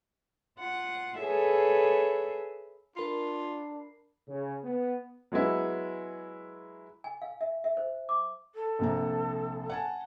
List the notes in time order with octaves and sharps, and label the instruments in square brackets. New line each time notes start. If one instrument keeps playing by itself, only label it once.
[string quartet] F4 F#5
G#4 A4 B4 C#5 E5
[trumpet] D4 [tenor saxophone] F4 [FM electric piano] A#4 B5 C7
[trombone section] C#3
B3
[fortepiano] F#3 G#3 B3 E4
[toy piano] G#5
F5
E5
E5
C5
D6
[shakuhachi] A4
[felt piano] A#1 C3 A#5
F#5 G#5 A5